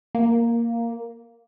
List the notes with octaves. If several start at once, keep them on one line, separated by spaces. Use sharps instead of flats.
A#3